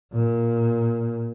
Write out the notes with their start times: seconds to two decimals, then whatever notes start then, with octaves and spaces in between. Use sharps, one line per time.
0.14 A#2